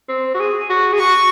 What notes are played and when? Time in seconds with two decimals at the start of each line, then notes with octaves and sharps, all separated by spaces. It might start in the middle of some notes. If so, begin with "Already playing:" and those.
0.09 C4
0.34 F#4
0.40 G#4
0.70 F#4
0.93 G#4
0.99 F#4 C#6